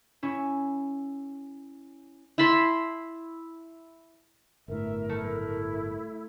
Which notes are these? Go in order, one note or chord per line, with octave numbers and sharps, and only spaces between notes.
C#4 E4
E4 A5 B5 C6
G1 A2 A#4 E5
A3 E4